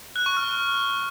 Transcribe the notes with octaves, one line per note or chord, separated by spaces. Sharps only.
F#6
C#6
F6